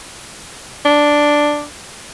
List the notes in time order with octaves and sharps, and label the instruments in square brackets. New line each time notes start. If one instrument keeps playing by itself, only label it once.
[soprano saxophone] D4